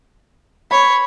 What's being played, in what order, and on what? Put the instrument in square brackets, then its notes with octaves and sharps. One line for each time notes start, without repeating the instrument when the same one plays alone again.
[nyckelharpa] C#5 [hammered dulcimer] B5